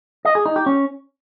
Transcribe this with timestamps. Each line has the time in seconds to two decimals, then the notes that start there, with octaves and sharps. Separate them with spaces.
0.25 D#5
0.35 G#4
0.46 D#4
0.56 G4
0.66 C#4